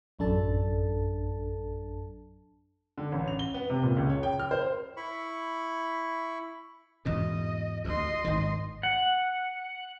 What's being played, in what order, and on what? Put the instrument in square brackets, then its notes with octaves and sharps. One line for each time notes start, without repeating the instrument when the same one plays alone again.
[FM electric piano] A1 F#2 D4 A4 A5
[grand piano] D3
A1
F7
G7
B3
C3
A#2
C#2
C#5
G5
F6
C5
[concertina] E4 B5 C#6
[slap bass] E2 G#2 B2 [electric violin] D#5
[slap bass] D2 [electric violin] D#5 C6
[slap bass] G#1 D#3
[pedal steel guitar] F#5